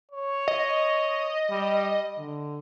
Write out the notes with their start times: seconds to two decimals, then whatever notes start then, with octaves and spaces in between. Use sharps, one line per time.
0.12 C#5
0.48 D#5
1.50 G3
2.18 D3